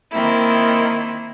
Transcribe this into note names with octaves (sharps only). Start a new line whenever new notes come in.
D#3 A#3 C4 E4